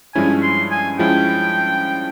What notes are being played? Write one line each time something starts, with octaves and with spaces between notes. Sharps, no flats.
G2 F3 G#3 C#4 E4 G#5
C6
G#5
F3 G#3 C#4 E4 G5